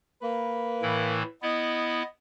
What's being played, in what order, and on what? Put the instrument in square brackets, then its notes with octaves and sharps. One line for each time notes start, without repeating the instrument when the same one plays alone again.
[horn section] A#3 B4
[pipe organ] A2 E3 E4
[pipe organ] B3 E4 [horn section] D#5